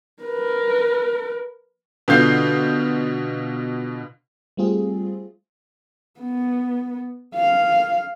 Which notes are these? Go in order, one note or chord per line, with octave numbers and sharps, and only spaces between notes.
A#4 B4
B2 D3 F4 G6 C7
G3 A3 C4 F4 G#4
B3
F5